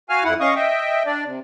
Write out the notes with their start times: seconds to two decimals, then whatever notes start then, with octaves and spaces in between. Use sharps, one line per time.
0.10 F#4 F5 G#5 F6
0.24 F2 E4 F#5
0.40 C#4 D#5 F5 C#6 D#6
0.55 D#5 E5 G5
1.06 D4 D5
1.24 C3